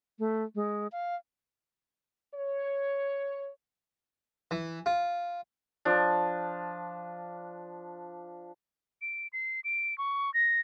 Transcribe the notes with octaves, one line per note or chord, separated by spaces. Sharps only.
A3
G#3
F5
C#5
E3
F4
F3 D4
D7
C7
D7
C#6
A#6